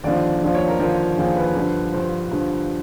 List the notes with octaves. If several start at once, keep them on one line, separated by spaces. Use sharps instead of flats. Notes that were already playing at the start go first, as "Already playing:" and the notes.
D#2 D3 F3 D5
D#2 D3 F3 D5
C#5
A#4
D#2 D3 F3 A#4
D#2 D3 F3 G#4
B4
G2 D3 F3
G2 D3 F3 C5
G2 D3 F3